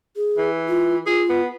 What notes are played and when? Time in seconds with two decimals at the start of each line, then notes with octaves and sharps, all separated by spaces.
0.16 G#4
0.38 E3
0.68 F4
1.06 F4 G#4
1.29 B3